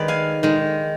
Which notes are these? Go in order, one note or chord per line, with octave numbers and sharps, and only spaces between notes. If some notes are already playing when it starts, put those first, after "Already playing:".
Already playing: D#3 G#3 B4 D5
F5 G#5
D#3 G#3